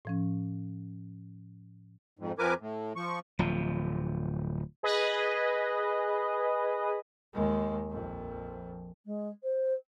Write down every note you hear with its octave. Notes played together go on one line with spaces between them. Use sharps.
A2 F3 C#4
F2 G#2
F2 F3 A#4 B4 G#5 D6
A2
F3 C#6
D1 F3
G#4 B4 D#5
D#2 G#3
A#1 F2
G#3
C5